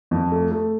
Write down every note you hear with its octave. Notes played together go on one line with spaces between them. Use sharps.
F2
A3
A3